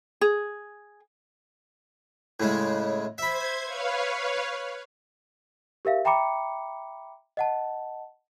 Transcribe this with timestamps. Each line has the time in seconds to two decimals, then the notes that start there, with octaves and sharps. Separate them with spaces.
0.21 G#4
2.40 A2 C#3 G#3
3.18 C5 E5 B5 G#6
3.63 B4 C#5 F5
5.85 G4 A#4 E5 F5
6.05 E5 G5 A#5 B5 D6 C#7
7.37 D#5 F#5 A5